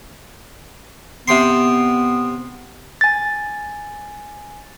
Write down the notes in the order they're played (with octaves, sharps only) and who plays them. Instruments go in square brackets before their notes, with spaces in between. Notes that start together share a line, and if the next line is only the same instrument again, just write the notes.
[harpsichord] C3 G5 C6 [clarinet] B3
[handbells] G#5 A6